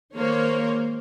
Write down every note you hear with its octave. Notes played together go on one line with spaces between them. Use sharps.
D#3 G#3 A#3 C5 C#5